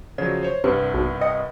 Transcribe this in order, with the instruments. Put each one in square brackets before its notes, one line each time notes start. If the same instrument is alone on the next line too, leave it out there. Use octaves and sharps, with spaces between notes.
[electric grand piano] C#3 F3 F#3 [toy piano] D5
[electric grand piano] C5 C#5
[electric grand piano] C2 G2 [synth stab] C3 [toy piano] B4
[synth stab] B1
[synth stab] D#5 [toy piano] G5